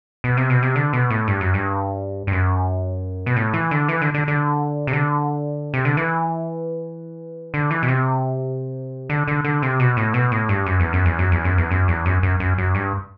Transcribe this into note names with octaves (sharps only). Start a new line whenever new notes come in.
B2
C3
B2
C3
D3
B2
A2
G2
F#2
G2
G2
F#2
B2
A2
E3
D3
E3
D3
D3
D3
C3
D3
C3
D3
E3
D3
E3
B2
C3
D3
D3
D3
C3
B2
A2
B2
A2
G2
F#2
E2
F#2
E2
F#2
E2
F#2
E2
F#2
E2
F#2
F#2
F#2
F#2
G2